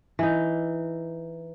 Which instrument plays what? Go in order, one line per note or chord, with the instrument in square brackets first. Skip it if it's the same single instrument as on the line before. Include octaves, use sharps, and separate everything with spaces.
[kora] E3 D#4